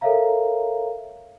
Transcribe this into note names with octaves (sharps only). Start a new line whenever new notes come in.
A4 A#4 C#5 E5 F5 A#5